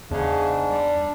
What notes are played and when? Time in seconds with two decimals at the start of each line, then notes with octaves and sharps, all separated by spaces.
0.11 E2 G#2 C#3 D4
0.65 G3